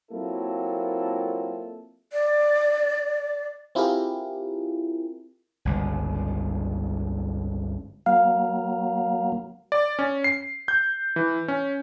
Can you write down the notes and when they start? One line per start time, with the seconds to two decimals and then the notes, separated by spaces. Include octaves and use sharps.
0.12 F#3 A#3 C4 E4 F4 A4
2.13 D5
3.75 C4 E4 F4 G4 G#4 A#4
5.65 G1 C#2
8.06 F#3 A#3 F5
9.72 D5
9.99 C#4
10.24 C7
10.68 G6
11.16 E3
11.48 C#4